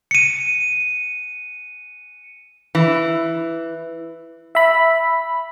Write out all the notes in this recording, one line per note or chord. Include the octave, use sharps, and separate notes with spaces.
C#7 D#7
E3
E5 B5